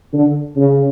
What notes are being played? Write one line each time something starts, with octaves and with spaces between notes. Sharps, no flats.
D3
C#3